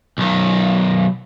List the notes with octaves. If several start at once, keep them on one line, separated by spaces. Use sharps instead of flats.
B1 D#3